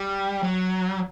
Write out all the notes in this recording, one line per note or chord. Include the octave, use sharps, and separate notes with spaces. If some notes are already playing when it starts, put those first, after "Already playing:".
Already playing: G3
F#3